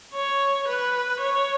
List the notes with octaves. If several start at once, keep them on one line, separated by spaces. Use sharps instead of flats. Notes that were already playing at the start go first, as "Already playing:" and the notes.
C#5
B4
C#5